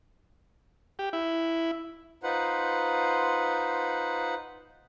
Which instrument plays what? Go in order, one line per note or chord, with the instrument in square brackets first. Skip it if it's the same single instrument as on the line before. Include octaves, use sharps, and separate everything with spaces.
[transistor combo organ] G4
E4
[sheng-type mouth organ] D#4 F4 B4 C5 F#5